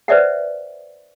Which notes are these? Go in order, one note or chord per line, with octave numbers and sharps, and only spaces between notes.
B4 C5 D5 E5 F#5